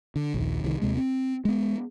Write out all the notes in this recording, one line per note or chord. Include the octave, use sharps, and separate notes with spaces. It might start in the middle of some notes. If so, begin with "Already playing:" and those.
D3
A#1 D#2
C2 D#3
D#2 C3 G#3
C4
G#3 B3